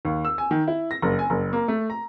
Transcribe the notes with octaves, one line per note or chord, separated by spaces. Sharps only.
D#2
E6
G#5
D#3
E4
A#6
F#1
G#5
F#1
A#3
A3
A#5